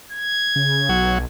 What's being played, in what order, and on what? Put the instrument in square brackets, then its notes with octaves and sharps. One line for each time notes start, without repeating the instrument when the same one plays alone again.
[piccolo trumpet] G#6
[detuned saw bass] C#3
[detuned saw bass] B1 [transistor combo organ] F#3